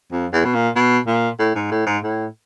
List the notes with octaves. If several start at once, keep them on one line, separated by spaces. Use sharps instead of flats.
F2
E2
B2
A#2
B2
A#2
A2
G#2
A2
G#2
A2